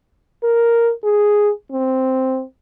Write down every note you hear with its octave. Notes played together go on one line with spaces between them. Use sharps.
A#4
G#4
C4